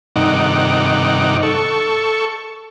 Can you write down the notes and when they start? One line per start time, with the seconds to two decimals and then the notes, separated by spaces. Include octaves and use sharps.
0.16 G2 C3 D#3 D#4 F#5 D6
1.43 A4 C#6